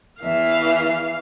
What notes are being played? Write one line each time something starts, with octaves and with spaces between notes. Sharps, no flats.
E2 E3 E5 F5